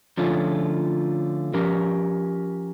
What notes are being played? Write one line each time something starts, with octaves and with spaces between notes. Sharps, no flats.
D3 F3 A3 C#4 F4
F3 C#4 G4 A#4